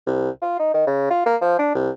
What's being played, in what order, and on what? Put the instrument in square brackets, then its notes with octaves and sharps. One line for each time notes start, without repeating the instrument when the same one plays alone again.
[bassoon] C2
F4
D#4
D#3
C#3
F4
A#3
F3
D4
C2